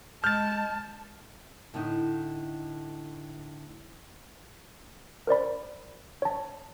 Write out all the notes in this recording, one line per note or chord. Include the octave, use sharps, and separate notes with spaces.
G#3 A5 F6 G6 A6
A2 D3 A3 D#4
A#4 C5 D5 B5
C#5 A5